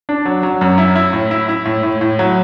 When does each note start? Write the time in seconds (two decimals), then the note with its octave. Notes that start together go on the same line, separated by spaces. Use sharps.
0.09 D4
0.25 F#3
0.43 F#3
0.61 F#2
0.78 E4
0.96 E4
1.13 A2
1.31 E4
1.49 E4
1.66 A2
1.83 A2
2.01 A2
2.19 F#3